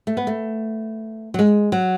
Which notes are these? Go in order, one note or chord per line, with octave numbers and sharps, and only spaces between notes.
A3
B3
A3
F#3
G#3
F#3